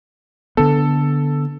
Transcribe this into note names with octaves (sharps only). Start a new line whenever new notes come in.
D3 B3 A4